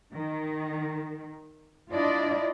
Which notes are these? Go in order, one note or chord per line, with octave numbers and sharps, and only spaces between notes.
D#3
D4 E4 F4 D5 D#5